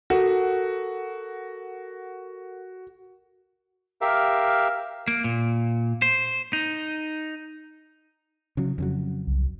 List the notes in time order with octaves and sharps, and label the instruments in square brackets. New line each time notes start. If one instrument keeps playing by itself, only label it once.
[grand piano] F#4 [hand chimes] A4 A#4 F#5
[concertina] G4 A#4 E5 F5
[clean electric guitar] A#3
A#2
C5
D#4
[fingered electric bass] C#3 F#3
F2 C#3 F#3
[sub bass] C2